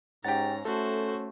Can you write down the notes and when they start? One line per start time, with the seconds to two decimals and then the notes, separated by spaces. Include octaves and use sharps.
0.24 G#2 C#4 G4 F#5 A#5 A6
0.65 A3 C#4 E4 F#4 A4 C5